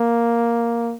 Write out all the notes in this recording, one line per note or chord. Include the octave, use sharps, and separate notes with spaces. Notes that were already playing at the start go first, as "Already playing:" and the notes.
Already playing: A#3